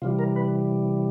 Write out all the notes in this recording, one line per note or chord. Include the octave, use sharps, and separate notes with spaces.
C3 E3 G3 F4
A#4
B4